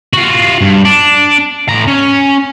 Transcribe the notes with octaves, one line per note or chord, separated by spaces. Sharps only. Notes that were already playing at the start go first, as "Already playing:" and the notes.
F4 F#4
G2
D4
A2 A#5
C#4